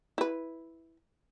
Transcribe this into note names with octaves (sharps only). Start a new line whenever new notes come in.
E4 B4